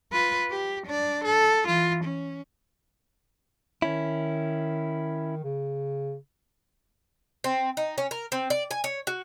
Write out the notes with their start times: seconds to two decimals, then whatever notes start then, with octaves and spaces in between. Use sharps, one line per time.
0.12 F4 B4
0.50 G4
0.86 D4 D5
1.24 A4
1.67 E3 F4
2.04 C#4
3.82 D#3 C#4 E4
5.44 C#3
7.44 C4
7.77 D#4
7.98 C#4
8.11 A#4
8.32 C4
8.50 D5
8.71 G#5
8.84 C#5
9.07 F#4